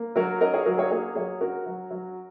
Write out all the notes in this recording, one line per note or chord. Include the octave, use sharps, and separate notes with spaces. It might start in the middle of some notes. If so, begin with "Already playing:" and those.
Already playing: A#3
F#3 F#4 A#4
C#4 A#4 D#5
G#4 C#5
F#3 F#4 A#4
G#4 C#5
A#3 G#4 C#5
F#3 G#4 C#5
C#4 F#4 A#4
F#3
F#3